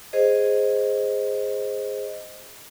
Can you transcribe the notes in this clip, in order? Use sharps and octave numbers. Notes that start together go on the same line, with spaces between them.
G#4 C5 D#5